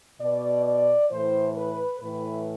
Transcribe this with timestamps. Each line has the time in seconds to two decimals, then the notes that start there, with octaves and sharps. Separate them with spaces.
0.21 B2 D5
0.66 D5
1.10 A2 E3 C5
1.56 B4
2.01 A2 E3 B4